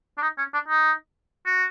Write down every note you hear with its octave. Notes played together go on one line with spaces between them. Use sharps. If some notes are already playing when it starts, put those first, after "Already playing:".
D4
D#4
C#4
D4
D#4
F#4